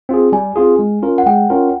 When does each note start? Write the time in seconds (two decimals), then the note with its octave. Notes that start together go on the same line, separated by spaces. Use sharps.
0.09 C4 F4 G#4
0.32 G3 G#5
0.56 C4 F4 G#4
0.79 G#3
1.02 C#4 F4 A#4
1.18 F#5
1.26 G#3 G5
1.50 C#4 F4 A#4